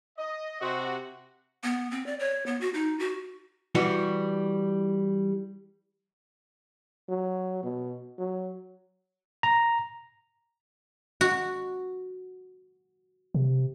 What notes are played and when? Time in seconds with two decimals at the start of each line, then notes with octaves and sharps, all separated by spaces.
0.18 D#5
0.61 C3 F#4
1.64 B3
1.91 C4
2.06 D5
2.20 C#5
2.46 B3
2.61 F#4
2.74 D#4
2.99 F#4
3.75 E3 G3 F#4
7.08 F#3
7.63 B2
8.18 F#3
9.43 A#5
11.21 F#4
13.34 C3